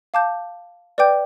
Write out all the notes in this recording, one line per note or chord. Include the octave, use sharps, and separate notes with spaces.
F5 A5 D6 G6
B4 D5 G5 D6 G6